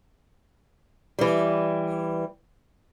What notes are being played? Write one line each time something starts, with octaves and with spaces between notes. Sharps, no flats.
E3 G3